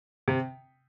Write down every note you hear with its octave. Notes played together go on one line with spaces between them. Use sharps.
C3